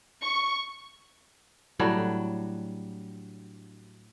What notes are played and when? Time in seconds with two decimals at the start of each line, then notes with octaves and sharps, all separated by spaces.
0.22 C#6
1.79 A2 F#3 G3 D4